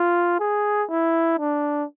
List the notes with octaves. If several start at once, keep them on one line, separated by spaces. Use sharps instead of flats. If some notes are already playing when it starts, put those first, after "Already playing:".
Already playing: F4
G#4
E4
D4